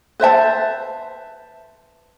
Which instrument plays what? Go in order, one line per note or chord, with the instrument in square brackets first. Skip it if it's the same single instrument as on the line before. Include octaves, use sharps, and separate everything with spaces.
[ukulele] B4 C5 E5 A5